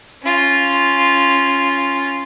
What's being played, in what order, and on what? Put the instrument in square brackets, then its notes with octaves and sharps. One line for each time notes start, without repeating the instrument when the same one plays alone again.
[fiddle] C#4 F4